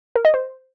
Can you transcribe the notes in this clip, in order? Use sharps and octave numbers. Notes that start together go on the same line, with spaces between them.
A#4
D#5
C5